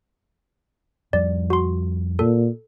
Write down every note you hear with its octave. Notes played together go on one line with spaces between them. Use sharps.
F2 F3 G3 D5
F#4 C6
A#2 A4